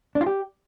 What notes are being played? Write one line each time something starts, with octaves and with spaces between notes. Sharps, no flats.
D4
F4
G4